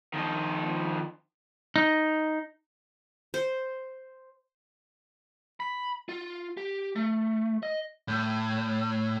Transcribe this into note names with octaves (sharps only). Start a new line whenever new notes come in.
D#3 F3
D#4
C5
B5
F4
G4
A3
D#5
A2